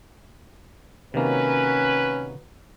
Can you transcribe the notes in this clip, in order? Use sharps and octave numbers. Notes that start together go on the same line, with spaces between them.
C3 D#3 F#3 A#3 C#4 B4